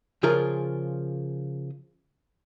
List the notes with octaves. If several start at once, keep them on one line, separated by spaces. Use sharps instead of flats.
C#3 F3 F4 G#4 A#4